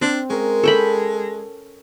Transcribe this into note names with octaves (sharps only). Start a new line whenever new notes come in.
C4 D4
G#3 C#4 A#4
C#4 A4 G5 B5